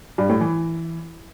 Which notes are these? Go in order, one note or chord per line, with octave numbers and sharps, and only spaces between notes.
G2
A2
E3